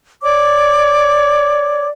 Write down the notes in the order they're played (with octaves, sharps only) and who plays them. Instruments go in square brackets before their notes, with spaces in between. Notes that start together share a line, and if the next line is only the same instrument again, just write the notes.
[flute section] C#5 D5 D6